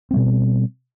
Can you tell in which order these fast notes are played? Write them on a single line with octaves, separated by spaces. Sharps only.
C4 G3 B2